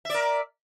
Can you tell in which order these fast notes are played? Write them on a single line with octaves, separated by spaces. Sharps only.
E5 D5 A#4